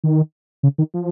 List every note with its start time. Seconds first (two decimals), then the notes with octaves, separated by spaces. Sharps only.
0.04 D#3
0.63 C#3
0.78 D#3
0.94 F3